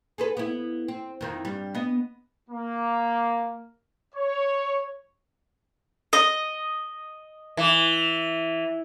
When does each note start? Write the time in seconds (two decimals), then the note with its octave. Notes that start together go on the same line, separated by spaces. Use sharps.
0.18 G#4 A4 B4
0.37 B3 E4
0.88 C4
1.21 F2 D#3 E4
1.45 G2 G3
1.75 B3 D#5
2.49 A#3
4.15 C#5
6.13 D#5
7.57 E3